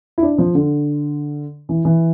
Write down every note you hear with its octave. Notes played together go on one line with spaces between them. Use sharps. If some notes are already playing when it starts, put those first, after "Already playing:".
E4
D4
F3
D3
E3
E3